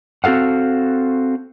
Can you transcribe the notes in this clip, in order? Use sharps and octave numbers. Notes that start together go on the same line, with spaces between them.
C4 F#4 A4 F5 F#5